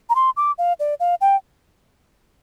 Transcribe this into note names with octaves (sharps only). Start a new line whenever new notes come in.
A#5
C6
D6
F5
D5
F5
G5